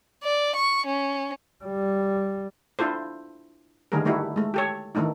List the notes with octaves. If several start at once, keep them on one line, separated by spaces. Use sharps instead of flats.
D5
C#6
C#4
G3
D4 E4 F4 A4 C5
D3 D#3 G3 A3 G#4 A#4
G3 A3 D#4 E4 F#4
G#3 A3
G4 A4 C#5
D#3 E3 A3 D4 D#4